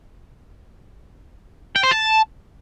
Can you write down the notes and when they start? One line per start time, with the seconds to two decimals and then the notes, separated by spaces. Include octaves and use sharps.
1.76 G5
1.83 C5
1.91 A5